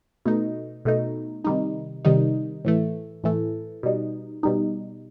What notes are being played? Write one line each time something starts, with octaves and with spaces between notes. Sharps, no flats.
B2 A3 D#4
B2 A3 D#4
C3 D#3 G3 D#4
C3 D#3 G3 D#4
A2 E3 A3
A2 E3 A3
B2 G3 D#4
B2 G3 D#4